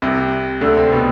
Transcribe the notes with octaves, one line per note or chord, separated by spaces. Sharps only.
C2 C3
D2 D3
C3 C4
B2 B3